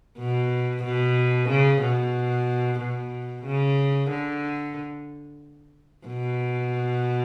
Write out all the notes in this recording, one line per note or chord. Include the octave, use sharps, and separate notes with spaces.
B2
B2
C#3
B2
B2
C#3
D3
B2